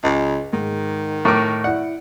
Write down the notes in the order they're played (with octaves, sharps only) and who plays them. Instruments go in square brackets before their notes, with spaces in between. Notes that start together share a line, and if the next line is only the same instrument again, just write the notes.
[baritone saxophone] C#2 [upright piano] D#5
[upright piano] G#2 [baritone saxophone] D#3
[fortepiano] A2 A#4 D6 [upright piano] C#6 D7
[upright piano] E4 D5 [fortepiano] F#5